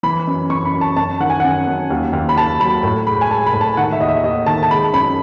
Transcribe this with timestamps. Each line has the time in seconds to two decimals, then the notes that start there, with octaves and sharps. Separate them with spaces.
0.03 E3 B5
0.27 F#2
0.50 F#2 C#6
0.65 B5
0.74 F#2
0.81 A5
0.96 F#2 A5
1.20 D#3 F#5
1.30 G#5
1.40 F#2 F#5
1.68 F#2
1.90 D#2
2.13 D#2
2.29 B5
2.36 D#2 A5
2.60 F#3 B5
2.83 A2
3.07 G#3 B5
3.21 G#5
3.30 G#3 A5
3.46 B5
3.53 A2
3.61 A5
3.77 D#3 F#5
3.93 E5
4.01 D#2 D#5
4.08 E5
4.24 D#2 D#5
4.46 D#3 A5
4.63 A5
4.71 G#3 B5
4.93 F#2 B5